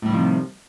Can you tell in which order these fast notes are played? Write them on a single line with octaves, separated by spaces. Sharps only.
A2 G3 D#3 F3 C3